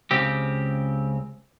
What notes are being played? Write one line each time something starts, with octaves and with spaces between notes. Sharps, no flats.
C#2 C#3 C4 G4